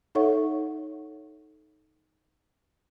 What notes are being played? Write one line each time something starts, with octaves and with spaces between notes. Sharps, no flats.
D#4 A4 C#5 E5 F#5 C#6